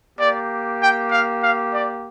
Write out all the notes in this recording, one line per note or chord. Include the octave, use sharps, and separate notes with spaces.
A#3 G4 D5
G5
F5
F5
D5